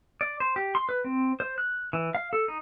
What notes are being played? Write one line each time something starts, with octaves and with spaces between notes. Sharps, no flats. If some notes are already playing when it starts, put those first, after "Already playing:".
D5
C5
G4
C6
B4
C4
C5
F#6
E3
F5
A4
D#4